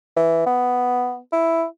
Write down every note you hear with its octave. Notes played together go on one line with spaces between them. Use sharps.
E3
B3
E4